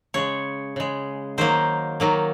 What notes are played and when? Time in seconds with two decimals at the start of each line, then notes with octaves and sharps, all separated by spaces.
0.14 C#3 G#3 C#5
0.76 C#3 G#3
1.38 D#3 F#3 A#3 C5
2.00 D#3 F#3 A#3